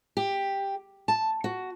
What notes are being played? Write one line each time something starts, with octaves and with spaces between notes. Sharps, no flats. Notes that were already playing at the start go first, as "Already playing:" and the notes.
G4
A5
F#4